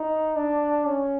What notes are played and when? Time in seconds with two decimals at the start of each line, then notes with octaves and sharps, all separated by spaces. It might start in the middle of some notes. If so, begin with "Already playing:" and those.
Already playing: D#4
0.36 D4
0.87 C#4